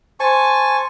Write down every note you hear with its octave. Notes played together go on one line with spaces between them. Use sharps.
C5 G#5 A5 C6 C#6